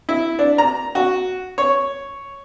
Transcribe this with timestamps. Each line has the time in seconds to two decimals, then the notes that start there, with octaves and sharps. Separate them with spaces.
0.09 E4
0.39 D4
0.58 A#5
0.95 F#4
1.58 C#5